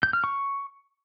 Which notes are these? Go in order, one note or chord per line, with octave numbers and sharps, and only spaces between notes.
G6
F6
C#6